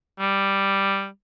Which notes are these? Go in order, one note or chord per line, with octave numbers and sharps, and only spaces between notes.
G3